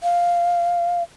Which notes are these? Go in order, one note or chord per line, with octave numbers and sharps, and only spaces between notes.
F5